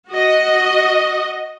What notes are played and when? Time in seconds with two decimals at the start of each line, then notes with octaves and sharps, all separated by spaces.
0.11 F#4 D#5